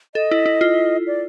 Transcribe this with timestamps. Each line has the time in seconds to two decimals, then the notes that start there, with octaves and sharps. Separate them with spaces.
0.15 A4 D#5
0.31 E4
0.46 E4
0.61 F4
1.07 D5